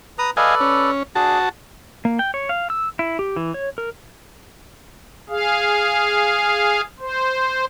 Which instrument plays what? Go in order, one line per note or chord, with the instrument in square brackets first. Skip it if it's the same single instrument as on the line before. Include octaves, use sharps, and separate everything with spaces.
[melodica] B4 A#5 D#6
[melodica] A4 B4 D5 [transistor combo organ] D#5 F5 G#5
[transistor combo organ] C#4
[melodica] D4 G#4 [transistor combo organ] F#4 A5
[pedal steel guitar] A#3
G5
C#5
F5
E6
E4
G4
E3
C#5
A#4
[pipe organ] G#4 F5
C5